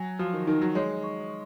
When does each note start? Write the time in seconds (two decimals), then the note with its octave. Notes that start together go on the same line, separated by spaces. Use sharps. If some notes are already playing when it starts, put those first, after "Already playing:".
Already playing: F#3 G#5
0.19 F3 F#4
0.33 D#3
0.47 D#3 D#4
0.61 F#3
0.75 G#3 C#5
1.04 C#6